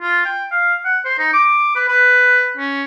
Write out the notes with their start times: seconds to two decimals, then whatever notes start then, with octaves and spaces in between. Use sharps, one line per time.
0.01 F4
0.25 G5
0.51 F5
0.85 F#5
1.05 C5
1.19 D#4
1.33 D6
1.76 B4
1.88 B4
2.57 C#4